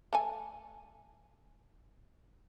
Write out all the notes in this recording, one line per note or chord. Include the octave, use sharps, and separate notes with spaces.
A3 A4 G#5